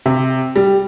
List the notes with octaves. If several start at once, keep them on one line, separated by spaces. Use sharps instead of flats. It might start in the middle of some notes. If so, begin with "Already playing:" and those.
C3
G3